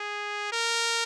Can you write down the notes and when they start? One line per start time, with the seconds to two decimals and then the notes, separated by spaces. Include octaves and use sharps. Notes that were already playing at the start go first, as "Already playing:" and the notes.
Already playing: G#4
0.52 A#4